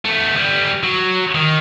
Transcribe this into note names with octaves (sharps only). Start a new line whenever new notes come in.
A3 B3
G3 B3
F#3
D#3